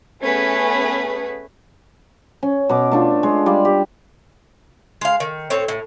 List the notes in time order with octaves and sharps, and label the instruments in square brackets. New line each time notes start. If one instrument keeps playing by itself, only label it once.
[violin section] A3 B3 C#4 G#4 B4
[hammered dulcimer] C#4
B2 D6
A3 D4 F4
G#3
G3 D5 F5
G4
[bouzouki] G#3 F5
D#3
A2 C4 C#5
A2